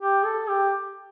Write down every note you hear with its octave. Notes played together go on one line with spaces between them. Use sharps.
G4
A4
G4